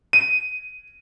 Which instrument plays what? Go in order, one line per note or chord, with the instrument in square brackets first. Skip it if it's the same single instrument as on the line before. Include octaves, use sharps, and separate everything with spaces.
[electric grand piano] D#7